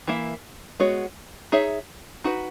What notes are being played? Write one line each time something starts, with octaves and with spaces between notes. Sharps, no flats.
E3 A#3 E4
G#3 B3 F#4 C#5
D#4 G#4 C#5 E5
D#4 F#4 B4